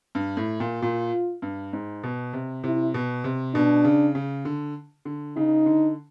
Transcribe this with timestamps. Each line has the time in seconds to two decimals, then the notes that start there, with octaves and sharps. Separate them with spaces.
0.15 G2
0.37 A2
0.60 A#2
0.82 A#2 F4
1.42 G2
1.73 G#2
2.04 B2
2.33 C3
2.64 C3 E4
2.94 B2
3.24 C3
3.54 B2 D4
3.84 C#3
4.15 C#3
4.45 D3
5.05 D3
5.36 C#3 D#4
5.66 D3